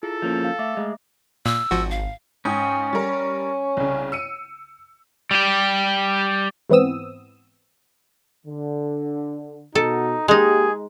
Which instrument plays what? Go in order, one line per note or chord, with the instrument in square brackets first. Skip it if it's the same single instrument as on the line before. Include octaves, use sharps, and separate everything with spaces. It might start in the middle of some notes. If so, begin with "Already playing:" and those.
[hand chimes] E4 F4 G#4 [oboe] A4
[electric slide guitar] F3 A#3 C#4
[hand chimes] F5
[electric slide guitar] A3 [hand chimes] E5 D6
[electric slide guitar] G#3 [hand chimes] A3 D#5
[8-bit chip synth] A#2 [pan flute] E6
[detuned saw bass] G#1 [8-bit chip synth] F3 F#4
[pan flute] F5
[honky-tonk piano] G#2 G5 D#6 [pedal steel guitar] C#4
[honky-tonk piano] G3 A#4 [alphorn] C#5
[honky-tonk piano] C2 C#3
E6 C#7 D#7
[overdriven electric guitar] G3 G4
[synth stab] G#2 E3 B3 C4 D#6 E6
[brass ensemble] D3
[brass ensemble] B2 F#4 [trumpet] D#4 [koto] A4
[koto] G#3 D#4 [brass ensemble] A#3 G4 [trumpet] G#4